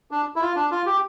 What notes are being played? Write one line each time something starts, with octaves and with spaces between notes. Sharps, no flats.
D4
E4
F4
D4
F4
G4